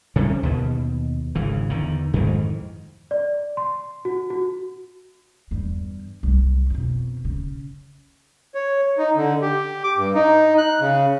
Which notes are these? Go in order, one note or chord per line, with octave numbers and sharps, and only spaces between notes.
C3 G3 C#4
D#2 B2
G#1 C#3 E3
E2 D3 D#3
F2 G#2 D#3 E3
D5
C6
F#4
F#4
E2 G2
C2 F#3
F2 B2
C#3
C#5
D#4
D3
G4
D6
G2
D#4
F#6
C#3